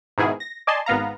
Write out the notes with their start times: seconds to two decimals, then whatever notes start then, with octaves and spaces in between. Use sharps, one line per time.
0.18 G#2 B2 D#3 E4 G#4
0.40 A#6
0.67 D5 D#5 G#5 A5 C6
0.86 G#1 B3 F5 A#5